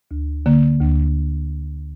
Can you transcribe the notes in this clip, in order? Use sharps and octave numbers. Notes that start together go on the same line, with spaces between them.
D2
D3 A#3
D2